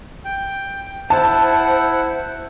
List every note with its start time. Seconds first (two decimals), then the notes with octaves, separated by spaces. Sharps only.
0.25 G5
1.10 E4 C5 F#5 A5